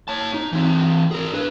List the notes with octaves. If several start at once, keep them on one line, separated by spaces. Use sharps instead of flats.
C#5 A5
D#4
E3 C4
G#4 A#4
D4 B4